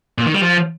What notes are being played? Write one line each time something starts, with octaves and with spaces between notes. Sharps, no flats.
A#2
D#3
G3
F3